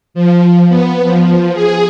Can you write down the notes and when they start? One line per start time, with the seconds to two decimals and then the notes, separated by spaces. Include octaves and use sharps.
0.14 F3
0.68 B3
1.04 F3
1.54 G#4